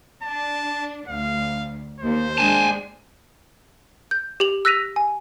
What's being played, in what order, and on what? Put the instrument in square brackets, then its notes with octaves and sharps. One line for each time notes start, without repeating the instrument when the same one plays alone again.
[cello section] D4 [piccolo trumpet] A5
[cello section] D2 [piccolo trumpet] F5
[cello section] D#2 [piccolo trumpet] C5
[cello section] G#3 D4 [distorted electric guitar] G#5 A5
[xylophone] G6
G4 F7 F#7
E6 F#6 A#6 B6 D#7 F7
G#5